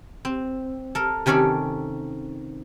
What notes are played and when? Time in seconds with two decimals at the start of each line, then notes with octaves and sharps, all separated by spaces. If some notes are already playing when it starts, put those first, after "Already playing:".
0.25 C4
0.95 A4 A#4
1.26 C3 D#3 C#4 A4 D5